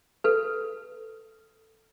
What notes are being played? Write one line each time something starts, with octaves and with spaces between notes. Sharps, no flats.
A4 B4